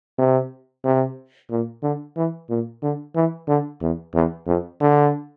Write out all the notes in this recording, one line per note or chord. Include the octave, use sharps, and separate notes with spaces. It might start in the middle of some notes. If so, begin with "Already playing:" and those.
C3
C3
A#2
D3
E3
A#2
D3
E3
D3
E2
E2
F2
D3